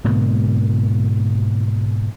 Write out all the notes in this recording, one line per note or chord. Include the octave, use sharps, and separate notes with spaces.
G#2 B2 D3 A#3